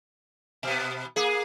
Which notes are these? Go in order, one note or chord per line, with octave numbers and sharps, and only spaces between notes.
B2 B3
A#3 G#4